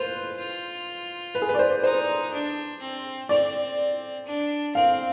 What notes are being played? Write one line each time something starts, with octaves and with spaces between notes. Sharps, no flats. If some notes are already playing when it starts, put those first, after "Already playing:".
Already playing: F4 B4 C5
F4
B4
G#4
B4
D5
C5
D#4 C5
D4
C4
C4 D5
D4
C4 F5